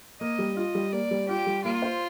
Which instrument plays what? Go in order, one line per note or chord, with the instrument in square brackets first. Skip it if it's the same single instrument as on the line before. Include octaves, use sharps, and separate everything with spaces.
[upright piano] A#3 [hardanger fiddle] D#5
[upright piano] G3
[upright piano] F4 [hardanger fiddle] D#5
[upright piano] G3
[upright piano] A#3 [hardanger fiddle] D5
[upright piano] G3
[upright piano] F4 [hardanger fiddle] G4
[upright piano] G3
[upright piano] A#3 [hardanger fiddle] F4
[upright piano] C5